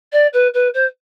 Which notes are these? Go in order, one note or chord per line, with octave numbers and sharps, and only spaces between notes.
D5
B4
B4
C5